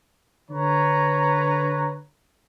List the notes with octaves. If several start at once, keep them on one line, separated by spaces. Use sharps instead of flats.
D3 B4 C#5 A#5